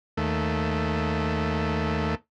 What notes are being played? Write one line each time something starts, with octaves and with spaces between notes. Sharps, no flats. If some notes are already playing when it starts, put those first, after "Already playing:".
D#2 A3